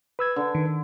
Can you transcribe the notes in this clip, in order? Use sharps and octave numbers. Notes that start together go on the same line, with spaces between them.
B4 E6 G#6
D3
D#3